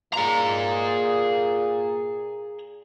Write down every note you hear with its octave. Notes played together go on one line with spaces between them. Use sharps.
A#2 G#4 A#5